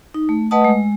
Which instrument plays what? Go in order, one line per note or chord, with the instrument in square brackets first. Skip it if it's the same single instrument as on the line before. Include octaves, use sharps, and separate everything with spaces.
[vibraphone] D#4
A3
A3 B4 D#5 F#5 A5 D#6
G#3